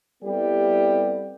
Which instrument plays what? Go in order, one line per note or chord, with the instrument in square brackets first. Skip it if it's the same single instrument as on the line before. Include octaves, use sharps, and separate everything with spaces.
[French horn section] G3 B3 C4 E4 G4 A4